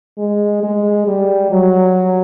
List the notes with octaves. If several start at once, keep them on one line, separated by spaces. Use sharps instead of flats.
G#3
G#3
G3
F#3